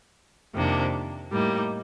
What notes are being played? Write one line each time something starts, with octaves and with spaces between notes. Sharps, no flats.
F2 C3 D#3 A#3 D4
A2 G3 A#3 D#4